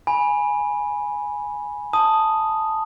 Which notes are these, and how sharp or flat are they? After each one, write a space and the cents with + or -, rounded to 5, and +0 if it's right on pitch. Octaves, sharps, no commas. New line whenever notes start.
G#5 +0 B5 -15
A5 +0 D#6 +0